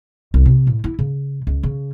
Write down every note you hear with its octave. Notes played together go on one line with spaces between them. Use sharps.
C2
C3
A2
E4
C#3
C#2
C#3